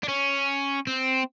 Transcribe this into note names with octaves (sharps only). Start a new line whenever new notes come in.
D4
C#4
C4